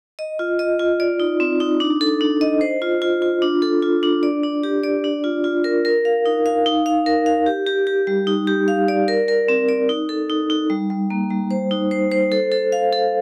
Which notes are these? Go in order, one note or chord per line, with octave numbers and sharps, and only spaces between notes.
D#5
F4
D#5
F4
D5
D#4
C4
D#4
D4
A4
D4
D#5
C5
F4
F4
F4
D4
A4
F4
D4
D5
D4
G4
D5
D4
F4
F4
A#4
A#4
F5
D#4
F5
D#4
F5
A#4
F5
G4
G4
G4
G3
D#4
G4
F5
D5
A#4
A#4
C4
D5
D#4
A4
D#4
D#4
G3
G3
A#3
G3
C5
D#4
C5
C5
A4
A4
F5
A4